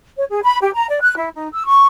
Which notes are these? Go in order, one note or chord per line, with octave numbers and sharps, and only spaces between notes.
C#5
G#4
B5
G4
A#5
D5
F#6
E4
D#4
E6
C#6